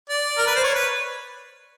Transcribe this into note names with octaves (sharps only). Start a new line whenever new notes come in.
D5
A#4
B4
C5
C#5
B4